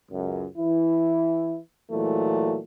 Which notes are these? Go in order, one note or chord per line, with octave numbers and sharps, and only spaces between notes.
C#2 F#2
E3 E4
A#2 E3 F#3 G#3 A3